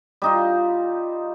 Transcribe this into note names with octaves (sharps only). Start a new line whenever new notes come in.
G3 D#4 F4